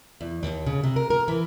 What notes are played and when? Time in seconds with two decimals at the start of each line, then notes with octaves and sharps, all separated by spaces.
0.21 E2
0.43 D#2
0.66 C#3
0.83 C3
0.96 A#4
1.10 A#4
1.28 E3